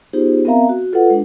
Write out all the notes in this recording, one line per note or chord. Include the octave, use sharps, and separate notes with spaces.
B3 D#4 F4 G4 G#4 C5
B3 C4 A#4 E5 F5 A#5
F#4
F4 A4 B4 D#5 F#5
G#3 D4